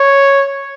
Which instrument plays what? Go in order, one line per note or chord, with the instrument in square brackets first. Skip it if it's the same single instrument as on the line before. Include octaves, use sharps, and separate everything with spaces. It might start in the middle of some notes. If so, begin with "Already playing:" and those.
Already playing: [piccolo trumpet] C#5